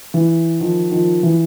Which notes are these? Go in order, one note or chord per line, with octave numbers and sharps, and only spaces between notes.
E3
D#3 F3
D#3 F3
E3